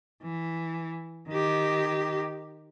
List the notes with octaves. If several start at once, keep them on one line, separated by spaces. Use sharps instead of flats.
E3
D#3 G4